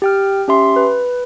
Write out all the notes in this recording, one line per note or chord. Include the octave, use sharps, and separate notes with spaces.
G4 G5 F6
C#4 G4 E5 C6
B4